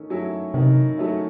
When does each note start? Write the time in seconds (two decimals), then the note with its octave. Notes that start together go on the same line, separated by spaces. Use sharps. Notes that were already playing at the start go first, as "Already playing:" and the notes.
Already playing: D#3 A3 C#4
0.10 F#3 A3 C#4 E4
0.54 C3 D#3
0.98 F#3 A3 C#4 E4